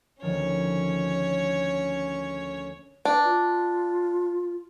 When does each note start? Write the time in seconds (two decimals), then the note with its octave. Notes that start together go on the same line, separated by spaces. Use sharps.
0.22 D2 D#3 F3 C#4 C#5
3.05 D4 B4
3.25 F4